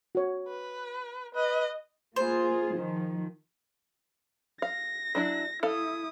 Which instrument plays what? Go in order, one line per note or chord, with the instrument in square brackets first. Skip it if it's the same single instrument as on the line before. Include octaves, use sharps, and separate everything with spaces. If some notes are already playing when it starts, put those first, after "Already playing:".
[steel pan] F#4 C#5
[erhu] B4
[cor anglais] B4 [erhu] D#5
[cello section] A#3 F4 G#4 [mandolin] C5
[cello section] D#3 F3
[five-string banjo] F5 [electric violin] A#6
[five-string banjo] F#3 D4 E4
[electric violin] E4 D#6 [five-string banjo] A4 F5